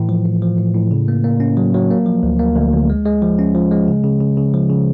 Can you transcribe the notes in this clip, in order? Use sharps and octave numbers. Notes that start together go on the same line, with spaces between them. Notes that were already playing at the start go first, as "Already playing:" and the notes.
Already playing: A2 E3
F3
A2
F3
A2
A2
C#3
A#3
A#3
C#4
F#3
F#3
A#3
F3
D2
A#3
D2
D2
G#3
G#3
F3
C#4
F3
G#3
C#3
C#3
C#3
C#3
F3
C#3